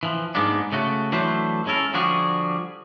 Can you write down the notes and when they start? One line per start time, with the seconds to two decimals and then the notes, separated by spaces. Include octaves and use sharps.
0.03 E3 F3
0.35 G#2 G#3 A#3 B3 D4
0.72 C#3 A3 F#4
1.12 E3 F#3 A3 D4 B4 C5
1.66 G#3 C#4 E4 A4 A#4
1.94 D3 F3 G3 F#4 G#4